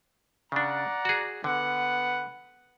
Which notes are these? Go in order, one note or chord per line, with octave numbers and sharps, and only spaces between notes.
C#3 D4 D5 F#5 A#5
F#4 G#4
D3 B3 B4 F#5